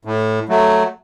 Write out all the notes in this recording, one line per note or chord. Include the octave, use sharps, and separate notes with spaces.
A2
F#3 A3